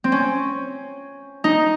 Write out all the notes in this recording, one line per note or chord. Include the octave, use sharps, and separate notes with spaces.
C4
C#4
D#4